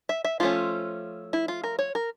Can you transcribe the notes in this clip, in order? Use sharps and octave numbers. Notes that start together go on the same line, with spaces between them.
E5
E5
F3 A3 C#4 F4
E4
F4
A#4
C#5
A#4